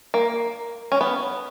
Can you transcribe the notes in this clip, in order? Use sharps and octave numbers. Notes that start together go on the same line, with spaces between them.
A#3
C#4
B3